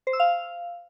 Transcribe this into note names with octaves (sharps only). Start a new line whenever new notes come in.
C5
E6
F5